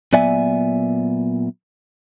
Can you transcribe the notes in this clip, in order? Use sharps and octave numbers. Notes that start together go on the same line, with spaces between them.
A#2 F#3 B3 D5 E5 G#5